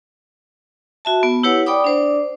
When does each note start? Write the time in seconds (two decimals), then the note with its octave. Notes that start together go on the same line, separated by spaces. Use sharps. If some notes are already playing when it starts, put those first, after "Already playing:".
1.05 F#4 E5 A5
1.23 B3
1.43 E4 G4 B4 C#5 F#5
1.66 D5 G5 B5 D6 D#6
1.84 D4 C5 D5